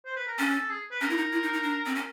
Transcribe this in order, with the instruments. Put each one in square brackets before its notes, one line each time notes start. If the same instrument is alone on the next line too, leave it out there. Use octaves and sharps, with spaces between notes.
[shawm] C5
B4
A#4
[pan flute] C#4 [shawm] A4
[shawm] G#4
B4
[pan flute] C#4 [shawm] A#4
[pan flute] E4
D#4
E4
D#4
D#4
D4
C4
C#4